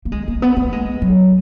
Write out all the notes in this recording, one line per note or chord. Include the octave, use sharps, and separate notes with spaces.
A#3
G#3
A#3
B3
A#3
G#3
F#3